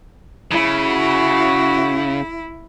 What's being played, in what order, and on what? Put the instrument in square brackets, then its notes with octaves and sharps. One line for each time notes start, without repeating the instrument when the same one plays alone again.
[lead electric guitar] C#3 [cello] E4
[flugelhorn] F#4